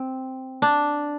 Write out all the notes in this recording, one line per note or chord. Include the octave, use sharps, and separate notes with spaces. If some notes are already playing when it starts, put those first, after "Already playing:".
Already playing: C4
D4